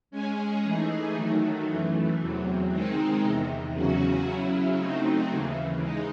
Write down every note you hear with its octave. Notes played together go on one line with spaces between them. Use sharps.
G#3 C#4 G#4
E3 A3 D#4 G#4
D#3 F#3 A3
F#2 E3 A3
E2 C3 F#3
D#3 G#3 C4 D#4
E2 C3 D#3
E2 C#3 F#3 C#4 F#4
C#3 F#3 C#4 E4
F#3 A3 C4 D#4
D#2 C#3 E3
G#3 D#4